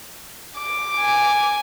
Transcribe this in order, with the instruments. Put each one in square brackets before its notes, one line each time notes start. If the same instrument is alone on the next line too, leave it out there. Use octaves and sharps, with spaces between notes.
[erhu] D6
[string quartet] G#5